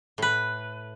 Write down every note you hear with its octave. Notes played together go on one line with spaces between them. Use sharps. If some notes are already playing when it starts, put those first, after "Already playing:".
A2 B4